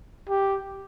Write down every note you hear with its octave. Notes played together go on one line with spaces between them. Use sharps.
G4